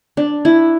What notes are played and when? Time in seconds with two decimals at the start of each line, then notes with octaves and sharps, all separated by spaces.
0.17 D4
0.45 E4